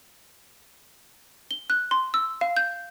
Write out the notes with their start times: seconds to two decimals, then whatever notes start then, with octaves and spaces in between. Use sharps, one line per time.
1.51 G7
1.70 F#6
1.91 C6
2.14 E6
2.41 F5
2.57 G6